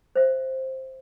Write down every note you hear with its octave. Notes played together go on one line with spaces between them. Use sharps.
C5 E5